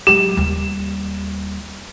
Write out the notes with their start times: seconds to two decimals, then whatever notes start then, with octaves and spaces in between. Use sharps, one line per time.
0.07 F#3 G#3 G4
0.37 D#2 G3